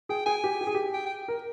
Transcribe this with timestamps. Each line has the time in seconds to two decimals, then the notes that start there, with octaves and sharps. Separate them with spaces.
0.09 G#4 G5
0.26 G#4 G#5
0.44 G4
0.61 G4
0.67 G#4
0.75 G4
0.94 G5
1.06 G5
1.28 A#4